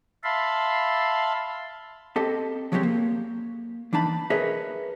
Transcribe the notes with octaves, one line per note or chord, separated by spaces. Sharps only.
E5 F5 A5 B5 C6
C4 G4 A4 D#5 A5 C6
F3 F#3 G#3 C4 G4 C#5
A#3
E3 D4 D#4 A5 B5
G#4 A#4 B4 C#5 D#5 E5